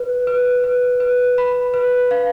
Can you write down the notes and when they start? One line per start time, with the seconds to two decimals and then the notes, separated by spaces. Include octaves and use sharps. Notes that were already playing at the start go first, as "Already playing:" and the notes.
Already playing: B4
0.27 B4
0.64 B4
1.00 B4
1.38 B5
1.74 B4
2.11 F5